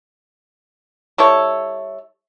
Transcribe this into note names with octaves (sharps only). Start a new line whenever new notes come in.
G3 E4 A4 C#5